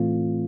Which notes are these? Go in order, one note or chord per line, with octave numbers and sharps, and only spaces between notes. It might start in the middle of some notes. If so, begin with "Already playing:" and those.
Already playing: A2 E3 A3 C4 F4